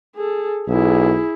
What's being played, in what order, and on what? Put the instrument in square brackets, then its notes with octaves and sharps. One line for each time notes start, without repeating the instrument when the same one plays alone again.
[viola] G#4 A4
[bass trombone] B1 [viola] E4 G#4